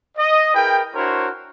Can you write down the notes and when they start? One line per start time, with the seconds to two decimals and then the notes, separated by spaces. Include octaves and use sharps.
0.18 D#5
0.54 E4 G#4 A#4 B4 G5
0.95 D4 E4 F#4 A#4 C5 C#5